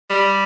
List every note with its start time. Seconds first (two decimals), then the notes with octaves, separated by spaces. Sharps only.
0.10 G3